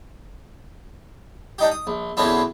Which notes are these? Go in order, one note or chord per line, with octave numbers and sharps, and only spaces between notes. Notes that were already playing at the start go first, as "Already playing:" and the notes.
D4 D#4 G4
D#6
A#1
E2 B2 D3 C4 C#4 E4